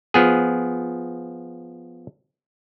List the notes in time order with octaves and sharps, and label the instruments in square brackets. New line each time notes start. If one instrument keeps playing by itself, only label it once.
[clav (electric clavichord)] F3 B3 G#4